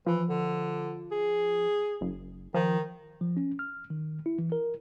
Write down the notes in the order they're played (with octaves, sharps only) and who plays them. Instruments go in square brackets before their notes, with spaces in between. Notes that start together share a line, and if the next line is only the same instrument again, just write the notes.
[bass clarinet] E3 [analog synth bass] F3
[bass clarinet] D3
G#4
[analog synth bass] F#1
[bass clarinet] D#3 [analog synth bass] F3
[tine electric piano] F3
C#4
F6
D#3
E4
E3
A#4